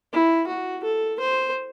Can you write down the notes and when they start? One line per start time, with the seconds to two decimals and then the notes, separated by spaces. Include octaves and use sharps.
0.13 E4
0.47 F#4
0.84 A4
1.20 C5